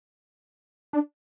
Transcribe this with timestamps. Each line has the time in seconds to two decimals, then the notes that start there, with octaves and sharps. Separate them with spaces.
0.93 D4